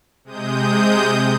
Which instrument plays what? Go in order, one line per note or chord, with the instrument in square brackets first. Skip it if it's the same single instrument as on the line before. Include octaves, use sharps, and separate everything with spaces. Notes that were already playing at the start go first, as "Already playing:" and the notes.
[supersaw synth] C3 G#3 D#6 G6